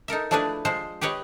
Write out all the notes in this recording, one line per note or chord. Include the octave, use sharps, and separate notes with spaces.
D#4 A4 A#4 E5
F3 A3 D4 E4 G#4 B4
F3 G#3 C5
G4 G#4 B4 C#5 D#5